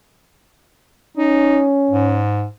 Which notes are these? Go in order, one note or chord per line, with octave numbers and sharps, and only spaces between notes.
C#4 D#4
G#2